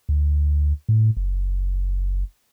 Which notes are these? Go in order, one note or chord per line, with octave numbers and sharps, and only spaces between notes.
D2
A2
F#1